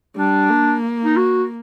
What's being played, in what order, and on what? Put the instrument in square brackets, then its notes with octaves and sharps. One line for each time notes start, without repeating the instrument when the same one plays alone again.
[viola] G3 [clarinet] D4
[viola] A#3
[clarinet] D#4
F#4